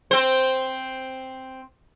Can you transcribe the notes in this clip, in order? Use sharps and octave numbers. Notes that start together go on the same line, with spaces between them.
C4 C5